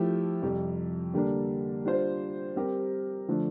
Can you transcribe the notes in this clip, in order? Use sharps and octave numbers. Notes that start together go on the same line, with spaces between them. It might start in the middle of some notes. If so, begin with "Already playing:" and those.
Already playing: F3 A3 E4 G4
F2 C3 G3
D3 G3 A#3 D4
G3 D4 F4 C5
G3 C4 G4 A#4
D3 F3 A3 D4